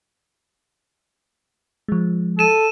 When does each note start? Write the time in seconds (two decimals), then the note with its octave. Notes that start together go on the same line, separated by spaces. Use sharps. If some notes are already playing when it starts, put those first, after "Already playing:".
1.88 F3 G#3
2.39 A4 D#7 E7